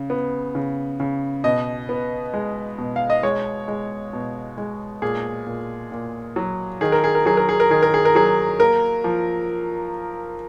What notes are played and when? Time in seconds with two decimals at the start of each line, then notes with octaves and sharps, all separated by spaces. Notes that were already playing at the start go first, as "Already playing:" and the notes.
Already playing: C#3
0.10 B3
0.55 C#3
1.00 C#3
1.44 B2 D#5
1.89 B3
2.34 G#3
2.78 B2
2.96 F5
3.10 D#5
3.23 G#3 C#5
3.68 G#3
4.13 B2
4.58 G#3
5.02 A#2 G#4
5.47 A#2
5.92 A#2
6.36 F#3
6.81 D#3 G#4
6.92 A#4
7.04 G#4
7.15 A#4
7.26 F#3 G#4
7.37 A#4
7.49 G#4
7.60 A#4
7.70 D#3 G#4
7.82 A#4
7.94 G#4
8.05 A#4
8.15 F#3 G#4
8.60 A#3 A#4
9.04 F3